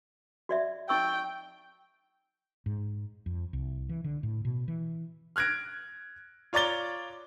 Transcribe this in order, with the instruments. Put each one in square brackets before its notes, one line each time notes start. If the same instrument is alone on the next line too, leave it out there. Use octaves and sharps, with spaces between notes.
[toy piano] F#4 D5 E5
[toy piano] D#4 C#6 E6 [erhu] G5
[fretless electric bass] G#2
F2
C2
E3
D3
A2
B2
E3
[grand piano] F6 F#6 G#6 A#6 D7
F4 C#5 D5 A#5 A6 G7